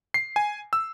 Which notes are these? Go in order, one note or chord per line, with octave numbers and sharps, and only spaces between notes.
C7
G#5
E6